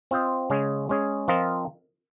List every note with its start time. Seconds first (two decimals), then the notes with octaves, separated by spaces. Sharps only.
0.11 C4 F4 C5 D#5
0.50 C#3 G#3 C#4 G#4
0.89 G#3 C#4 G#4
1.28 F3 C4 F4 A#4 D#5